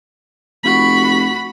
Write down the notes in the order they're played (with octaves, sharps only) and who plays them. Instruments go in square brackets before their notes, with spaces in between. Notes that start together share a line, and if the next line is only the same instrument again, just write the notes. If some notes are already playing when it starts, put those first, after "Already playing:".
[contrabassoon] F1 [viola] F#4 B5